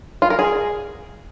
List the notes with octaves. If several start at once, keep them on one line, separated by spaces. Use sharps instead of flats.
F4
A#4
G#4